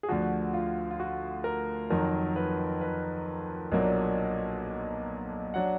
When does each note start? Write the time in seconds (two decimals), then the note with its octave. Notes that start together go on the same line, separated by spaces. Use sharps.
0.03 G#4
0.09 D2 D3 F3 F#4
0.53 F4
0.91 F4
1.00 F#4
1.44 A#4
1.90 F2 D#3 F#3 A#4
2.36 B4
2.81 B4
3.72 B1 A#2 F#3 A#3 D4
5.54 F#3 D4 F#5